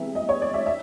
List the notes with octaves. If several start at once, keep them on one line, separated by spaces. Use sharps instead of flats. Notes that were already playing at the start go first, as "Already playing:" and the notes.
Already playing: C2 C3 E3 G#3 B3 E5
D#5
C#5
D5
E5
E5